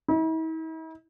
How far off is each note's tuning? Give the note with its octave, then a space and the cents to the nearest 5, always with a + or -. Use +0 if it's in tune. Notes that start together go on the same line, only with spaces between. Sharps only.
E4 -45